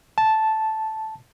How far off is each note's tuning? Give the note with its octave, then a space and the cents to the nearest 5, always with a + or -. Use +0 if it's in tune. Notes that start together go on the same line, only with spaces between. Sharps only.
A5 -5